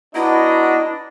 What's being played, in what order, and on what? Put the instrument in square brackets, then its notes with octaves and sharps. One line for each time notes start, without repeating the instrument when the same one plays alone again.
[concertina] B3 F#4 A#5 [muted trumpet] D4 [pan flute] E4 [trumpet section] D#5